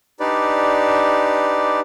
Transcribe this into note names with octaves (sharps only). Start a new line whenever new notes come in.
D4 D#4 G4 B4 D5